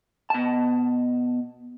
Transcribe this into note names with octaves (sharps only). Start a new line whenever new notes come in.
B2 A5